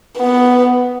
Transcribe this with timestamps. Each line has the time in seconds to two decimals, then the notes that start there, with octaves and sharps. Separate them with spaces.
0.18 B3